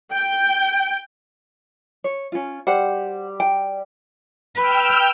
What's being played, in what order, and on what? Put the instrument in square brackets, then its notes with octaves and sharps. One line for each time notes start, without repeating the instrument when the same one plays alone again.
[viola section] G5
[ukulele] C#5
C#4 F4
[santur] G3 [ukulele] C5 F#5
[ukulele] G5
[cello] B4 [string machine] G5 E6 F6